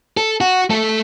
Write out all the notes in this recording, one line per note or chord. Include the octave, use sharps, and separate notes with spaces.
A4
F#4
A3 A4